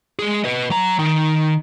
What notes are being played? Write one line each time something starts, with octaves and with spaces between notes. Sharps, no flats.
G#3 G#4
B4 D#5
F#3 A#5
D#3